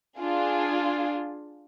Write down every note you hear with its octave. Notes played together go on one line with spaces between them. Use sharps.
D4 F4 G#4